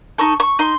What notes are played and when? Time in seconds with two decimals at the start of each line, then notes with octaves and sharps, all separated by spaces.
0.18 D#4 A4 C#6
0.40 C#6
0.59 D#4 C6